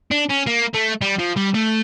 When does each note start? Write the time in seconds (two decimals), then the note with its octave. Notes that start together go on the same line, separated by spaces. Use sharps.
0.11 D4
0.29 C#4
0.47 A#3
0.74 A3
1.01 G3
1.19 F3
1.36 G3
1.54 A3